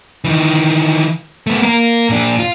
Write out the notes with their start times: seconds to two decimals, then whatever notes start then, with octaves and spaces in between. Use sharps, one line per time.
0.24 D#3 E3
1.47 A3 B3
1.62 A#3 A#4
2.10 A#2 D4
2.39 F4